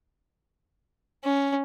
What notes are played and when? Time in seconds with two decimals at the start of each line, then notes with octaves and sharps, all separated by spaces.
1.24 C#4